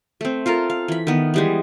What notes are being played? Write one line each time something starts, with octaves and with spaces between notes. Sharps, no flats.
A3 C4
F4 A4 A#4 F5
F5
E3 B5
D#3 B3
E3 G3 G#3